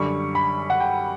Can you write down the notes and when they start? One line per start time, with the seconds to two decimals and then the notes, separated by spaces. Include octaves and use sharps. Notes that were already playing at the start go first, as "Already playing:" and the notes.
Already playing: F#2 D3 G3 C#6
0.35 B5
0.70 F#5
0.80 G5